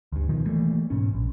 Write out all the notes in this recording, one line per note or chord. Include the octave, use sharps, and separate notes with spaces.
D2 G2
B2 D#3 F3
E3 G3 A3 A#3
G#2 B2 C#4
A#1